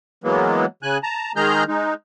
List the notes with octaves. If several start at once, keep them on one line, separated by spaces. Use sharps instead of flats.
E3 F#3 G#3 A#3 B3
C#3 G#5 F#6
A5 A#5
D#3 G#3 G#4 A#5 F6 G6
G#3 D#4